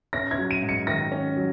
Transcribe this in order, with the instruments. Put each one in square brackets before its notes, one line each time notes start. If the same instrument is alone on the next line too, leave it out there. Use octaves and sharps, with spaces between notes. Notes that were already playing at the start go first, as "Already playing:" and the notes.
[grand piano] C#4 [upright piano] A#6
[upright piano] G#6
[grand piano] F#3
[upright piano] D#7
[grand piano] G#2
[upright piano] C#7
[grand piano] D#3 [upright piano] A#6
[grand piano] C#4
F#3